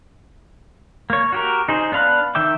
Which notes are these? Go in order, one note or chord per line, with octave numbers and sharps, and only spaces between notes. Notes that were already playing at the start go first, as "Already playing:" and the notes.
A#3 C#5
F#4 G4 A#4
D#4 G#4 C5
B3 D4 F5 B5 F#6
D#3 E5 G5 D6